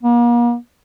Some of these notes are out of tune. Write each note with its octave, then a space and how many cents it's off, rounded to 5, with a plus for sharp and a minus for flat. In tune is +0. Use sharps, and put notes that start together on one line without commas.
A#3 +40